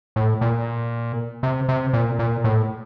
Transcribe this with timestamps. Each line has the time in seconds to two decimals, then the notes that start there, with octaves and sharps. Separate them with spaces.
0.16 A2
0.41 A#2
1.43 C3
1.69 C3
1.93 A#2
2.19 A#2
2.44 A2